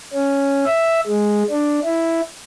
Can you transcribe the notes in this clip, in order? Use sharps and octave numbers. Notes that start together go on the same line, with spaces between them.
C#4
E5
G#3
D4
E4